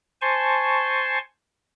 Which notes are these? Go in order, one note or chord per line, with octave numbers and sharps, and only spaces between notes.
C5 G#5 A5 C6 C#6